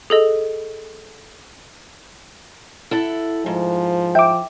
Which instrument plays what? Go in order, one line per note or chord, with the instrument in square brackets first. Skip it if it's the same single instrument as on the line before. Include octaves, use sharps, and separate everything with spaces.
[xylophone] G#4 A4 D#5
[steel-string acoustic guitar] E4 A4 F#5
[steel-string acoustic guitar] G#2 [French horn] F3
[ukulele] E5 [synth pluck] G5 D6